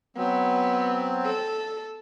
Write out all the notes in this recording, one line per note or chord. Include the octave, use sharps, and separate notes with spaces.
F#3 B3 C4
A4